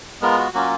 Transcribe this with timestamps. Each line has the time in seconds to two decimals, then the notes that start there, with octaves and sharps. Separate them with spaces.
0.21 G#3 B3 F4 A#4
0.38 F#4
0.54 F#3 A#3 C#4 F4 F#4